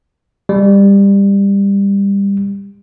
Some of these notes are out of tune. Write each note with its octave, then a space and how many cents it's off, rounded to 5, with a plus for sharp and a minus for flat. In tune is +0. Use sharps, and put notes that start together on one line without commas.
G3 +20